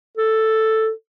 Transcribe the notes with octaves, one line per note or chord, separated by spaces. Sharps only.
A4